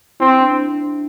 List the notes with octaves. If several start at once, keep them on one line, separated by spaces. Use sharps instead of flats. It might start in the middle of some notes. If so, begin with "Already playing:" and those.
C4 E4
D4